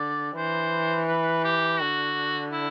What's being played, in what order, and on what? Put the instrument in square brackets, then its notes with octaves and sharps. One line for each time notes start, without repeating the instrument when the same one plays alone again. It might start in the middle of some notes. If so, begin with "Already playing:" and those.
Already playing: [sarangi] D3 [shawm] D5
[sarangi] E3 [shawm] C5
[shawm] B4
G4
[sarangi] D3 [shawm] F#4
[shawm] E4